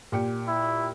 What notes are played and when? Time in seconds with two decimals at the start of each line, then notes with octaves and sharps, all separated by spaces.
0.12 A#2 G4 C#7
0.48 E4